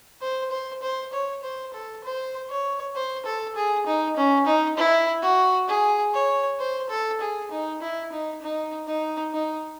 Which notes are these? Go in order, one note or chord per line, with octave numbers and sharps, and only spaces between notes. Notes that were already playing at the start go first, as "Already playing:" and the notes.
C5
C5
C5
C#5
C5
A4
C5
C#5
C5
A4
G#4
D#4
C#4
D#4
E4
F#4
G#4
C#5
C5
A4
G#4
D#4
E4
D#4
D#4
D#4
D#4